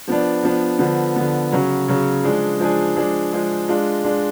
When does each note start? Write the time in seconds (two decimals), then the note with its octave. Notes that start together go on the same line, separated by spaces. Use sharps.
0.08 F3 B3 D4
0.43 F3 B3 D4
0.79 D3 F3 B3
1.16 D3 F3 B3
1.52 C#3 F#3 C#4
1.88 C#3 F#3 C#4
2.23 F3 G#3 D4 G#4
2.59 F3 G#3 D4 G#4
2.96 F3 G#3 D4 G#4
3.33 F3 G#3 D4 G#4
3.68 G#3 D4 F4
4.04 G#3 D4 F4